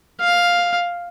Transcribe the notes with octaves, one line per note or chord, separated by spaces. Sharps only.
F5